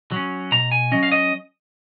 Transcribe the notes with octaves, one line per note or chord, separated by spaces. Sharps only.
F#3 C#4
B2 A#5
G#5
F#3 C#4 D#5
F5
D#5